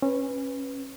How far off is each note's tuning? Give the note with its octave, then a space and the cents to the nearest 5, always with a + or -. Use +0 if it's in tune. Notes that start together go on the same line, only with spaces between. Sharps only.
C#4 -20 B4 +0